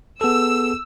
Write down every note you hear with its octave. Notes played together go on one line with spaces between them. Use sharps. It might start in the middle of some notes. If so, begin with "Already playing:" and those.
B3 G#4 A4 E6